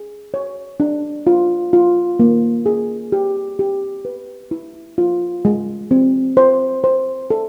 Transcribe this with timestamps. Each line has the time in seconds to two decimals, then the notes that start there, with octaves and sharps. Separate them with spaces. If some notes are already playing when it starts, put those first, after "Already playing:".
Already playing: G#4
0.34 C#5
0.80 D4
1.27 F4
1.73 F4
2.20 A#3
2.66 G#4
3.12 G4
3.59 G4
4.05 B4
4.51 E4
4.98 F4
5.45 G#3
5.91 C4
6.37 C5
6.84 C5
7.30 A4